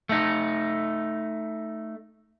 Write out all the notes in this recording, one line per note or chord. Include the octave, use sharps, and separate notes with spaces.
A3 D#4